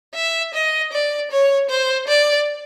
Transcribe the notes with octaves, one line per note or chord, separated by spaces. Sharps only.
E5
D#5
D5
C#5
C5
D5